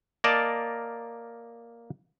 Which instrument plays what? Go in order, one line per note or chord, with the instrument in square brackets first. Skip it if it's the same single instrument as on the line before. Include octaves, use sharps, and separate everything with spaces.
[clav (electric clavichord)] A#3 A#4 D5 D#5 A5